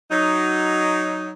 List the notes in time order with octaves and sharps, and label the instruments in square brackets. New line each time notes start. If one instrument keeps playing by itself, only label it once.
[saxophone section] F#3 D#4